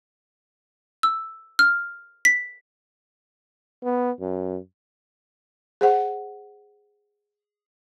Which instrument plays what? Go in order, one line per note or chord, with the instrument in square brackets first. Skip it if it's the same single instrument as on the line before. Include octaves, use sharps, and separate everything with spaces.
[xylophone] E6
F6
B6
[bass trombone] B3
F#2
[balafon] G#4 C5 F#5